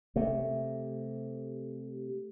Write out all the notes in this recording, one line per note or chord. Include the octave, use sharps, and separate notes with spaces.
C3 A3